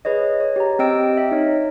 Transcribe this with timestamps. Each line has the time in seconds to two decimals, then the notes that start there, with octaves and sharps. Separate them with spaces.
0.05 G#4 B4 C#5 D#5
0.40 C#5
0.56 G4 A#5
0.79 C4 G4 D#5 G5 E6 D7
1.17 D#5 E5
1.31 D#4 C#5